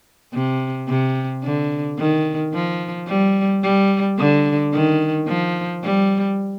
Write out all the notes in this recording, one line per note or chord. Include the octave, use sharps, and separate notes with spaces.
C3
C3
D3
D#3
F3
G3
G3
D3
D#3
F3
G3